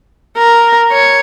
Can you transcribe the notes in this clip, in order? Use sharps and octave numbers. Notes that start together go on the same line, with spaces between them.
A#4
C#5